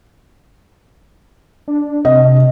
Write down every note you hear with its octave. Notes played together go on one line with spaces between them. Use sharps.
D4
C3 D#5